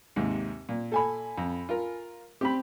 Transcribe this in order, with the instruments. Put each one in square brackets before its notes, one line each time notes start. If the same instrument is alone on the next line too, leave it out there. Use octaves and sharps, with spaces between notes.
[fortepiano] D#2 G#2 C3
A#2
[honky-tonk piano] A4 G#5 B5
[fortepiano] F2
F4 A#4
[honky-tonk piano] C4 [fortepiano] G4 B5